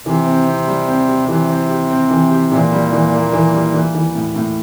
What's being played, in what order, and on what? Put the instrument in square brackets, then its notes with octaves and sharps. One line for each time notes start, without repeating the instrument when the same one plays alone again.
[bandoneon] C3 [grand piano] E3
[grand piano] C4
C4
G3
C4
G4
[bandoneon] C3 [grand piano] E3
[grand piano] C4
G4
C4
E3
G4
[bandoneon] A#2 [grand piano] E3
[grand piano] G3
E3
A#3
E3
G3
E3
E3
A2
A2